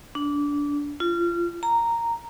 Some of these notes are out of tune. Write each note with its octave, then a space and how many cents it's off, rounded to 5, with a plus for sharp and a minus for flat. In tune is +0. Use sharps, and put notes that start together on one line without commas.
D4 -20
F4 -25
A#5 -5